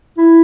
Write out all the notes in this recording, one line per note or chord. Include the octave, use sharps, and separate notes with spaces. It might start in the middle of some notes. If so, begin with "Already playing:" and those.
E4